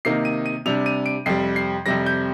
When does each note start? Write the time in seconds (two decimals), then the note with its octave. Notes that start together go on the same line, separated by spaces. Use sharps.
0.05 C3 D#3 A#3 D#4 C7
0.25 D#7
0.46 D#7
0.66 C3 G3 D4 F7
0.86 D#7
1.06 D7
1.26 F2 C3 G3 C7
1.56 C7
1.86 F2 C3 G3 A#6
2.06 G6